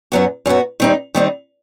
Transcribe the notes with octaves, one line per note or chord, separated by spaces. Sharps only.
F#2 F#3 B3 F#4
F#2 F#3 B3 F#4
D#3 G3 C4 D#4
D#3 G3 C4 D#4